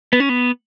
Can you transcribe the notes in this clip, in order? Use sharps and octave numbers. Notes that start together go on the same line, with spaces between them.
B3
C#4
B3